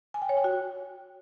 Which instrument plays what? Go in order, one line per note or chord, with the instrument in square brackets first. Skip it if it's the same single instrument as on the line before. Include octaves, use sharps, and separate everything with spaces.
[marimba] G#5
G5
C#5
G5
F#4